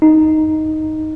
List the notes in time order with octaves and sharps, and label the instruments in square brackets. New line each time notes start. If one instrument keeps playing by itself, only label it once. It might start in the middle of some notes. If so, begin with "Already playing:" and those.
[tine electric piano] D#4